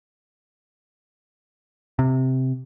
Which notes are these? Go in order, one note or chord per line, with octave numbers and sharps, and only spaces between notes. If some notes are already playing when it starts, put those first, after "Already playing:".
C3